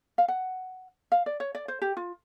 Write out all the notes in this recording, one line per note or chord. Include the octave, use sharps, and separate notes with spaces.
F5
F#5
F5
D5
C#5
D5
C5
G4
F4